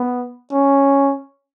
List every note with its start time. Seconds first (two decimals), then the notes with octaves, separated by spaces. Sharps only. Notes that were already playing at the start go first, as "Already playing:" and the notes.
Already playing: B3
0.52 C#4